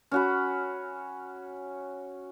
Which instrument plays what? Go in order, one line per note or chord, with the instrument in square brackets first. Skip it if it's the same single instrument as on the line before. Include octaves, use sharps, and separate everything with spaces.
[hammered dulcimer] C#4 F#4 B5